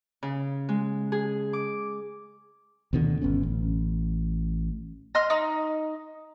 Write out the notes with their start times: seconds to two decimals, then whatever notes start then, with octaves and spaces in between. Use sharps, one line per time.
0.23 C#3
0.69 G#3
1.12 G#4
1.53 D6
2.93 D2 B2 D3 D#3
3.22 G1 B3 C#4
3.43 A1
5.15 D#5 C6 F6
5.30 D#4